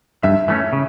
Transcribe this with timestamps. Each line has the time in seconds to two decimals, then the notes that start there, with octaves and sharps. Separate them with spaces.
0.23 G2 E5
0.48 E3 A3 C#4
0.73 C#3